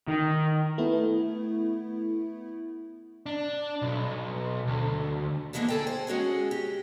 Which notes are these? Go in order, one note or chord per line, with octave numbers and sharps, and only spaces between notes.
D#3
A3 B3 E4
D4
B1
D2
D3 E3 F3 G#3 A#3 B3
G#4 A4 G5
C5
G#3 C#4 F#4 G#4
G4